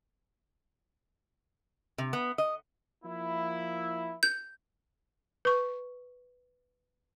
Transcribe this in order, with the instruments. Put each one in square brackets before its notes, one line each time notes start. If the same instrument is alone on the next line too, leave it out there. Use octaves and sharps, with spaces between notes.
[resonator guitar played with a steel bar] C3
B3
D#5
[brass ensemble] F3 A#3 E4
[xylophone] G6
[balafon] B4 C#6